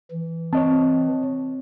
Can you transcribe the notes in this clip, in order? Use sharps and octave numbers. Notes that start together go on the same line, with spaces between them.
E3
C4 C#5 D#5 A5